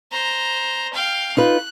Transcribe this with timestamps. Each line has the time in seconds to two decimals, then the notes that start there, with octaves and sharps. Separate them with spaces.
0.12 C5 A#5
0.93 F5 G5
1.37 D#4 F4 B4 F#6